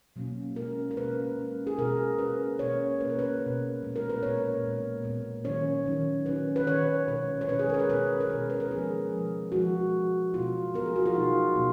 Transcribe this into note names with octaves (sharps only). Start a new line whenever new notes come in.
B2 F#3 A#3 C#4
B2 G#3 C#4 A#4
A#4
B2 G#3 C#4 B4
B2 G#3 C#4
G#4
B2 G#3 C#4 A#4
B2 A#3 C#4 B4
B2 A#3 C#4 C#5
B2 A#3 C#4 B4
A#4
B4
B2 A#3 C#4
A#2 G#3 B3
A#4
B4
A#2 G#3 B3 C#5
A#2 G#3 B3
A#2 G#3 B3
D#3 F#3 C#4 C#5
D#3 F#3 C#4
D#3 F#3 C#4 B4
B4
D#3 F#3 C#4 C#5
B2 G#3 C#4 B4
C#5
B2 G#3 C#4 B4
G#4
A#4
C#5
B4
B2 G#3 C#4 B4
A#4
B2 G#3 C#4 B4
B4
A#4
F3 G#3 B3 G#4
F3 G#3 B3
F3 G#3 B3 F#4
F3 G#3 B3
B2 F#3 B3 F4
B2 F#3 B3 A#4
G#4
F#4
F4
B2 F#3 B3 D#4
B2 F#3 B3